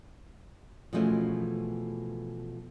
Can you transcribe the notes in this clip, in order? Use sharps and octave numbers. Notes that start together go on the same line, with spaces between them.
B2 E3 F3 G#3 A3 C#4